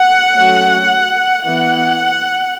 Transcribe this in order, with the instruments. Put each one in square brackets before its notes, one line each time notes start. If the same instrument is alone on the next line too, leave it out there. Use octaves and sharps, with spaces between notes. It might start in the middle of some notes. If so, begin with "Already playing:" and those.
Already playing: [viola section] F#5
F#3 A3 C#4
E3 B3 F#5